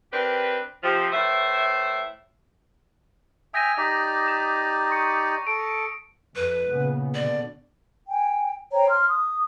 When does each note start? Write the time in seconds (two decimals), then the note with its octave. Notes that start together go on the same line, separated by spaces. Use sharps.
0.13 C4 D4 G4 A#4 B4
0.83 C3 F3
1.13 A2 E3 C5 E5
3.54 E5 G5 G#5 D#6 A#6 D#7
3.78 D#4 G4 D5 B6
4.27 D#6 E7
4.91 C#6 C#7
5.47 A4 D7
6.35 F2 B4
6.69 A#2 C#3 B3
7.14 B2 D3 D5
8.09 G5 G#5
8.73 C5 C#5 G5 A#5
8.88 C6 F6
9.09 D#6